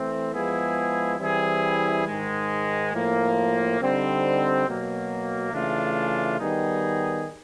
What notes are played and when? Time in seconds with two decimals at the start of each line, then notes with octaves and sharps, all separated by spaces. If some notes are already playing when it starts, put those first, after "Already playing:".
Already playing: E3 A3 C4
0.33 F3 G#3 B3 E4 G#4
1.19 E3 G3 C4 E4 G#4
2.06 G#2 D#3 G#3
2.93 A2 F3 A#3
3.79 D3 G3 C4 D#4
4.66 B2 F#3 A#3
5.52 C#3 E3 A3 D4 F4
6.40 D#3 G3 B3 D#4 G#4